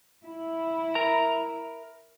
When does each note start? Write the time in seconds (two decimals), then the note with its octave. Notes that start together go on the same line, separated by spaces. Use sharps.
0.24 E4
0.95 A#4 A#5